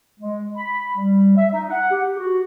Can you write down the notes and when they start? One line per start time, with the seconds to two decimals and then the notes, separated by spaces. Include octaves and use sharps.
0.20 G#3
0.56 B5
0.96 G3
1.37 E5
1.52 D#4
1.70 F#5
1.90 G4
2.18 F#4